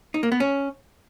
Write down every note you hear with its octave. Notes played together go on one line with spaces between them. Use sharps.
D#4
A#3
B3
C#4